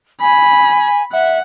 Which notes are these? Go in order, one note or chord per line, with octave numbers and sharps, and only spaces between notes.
G#5 B5
E5 F#5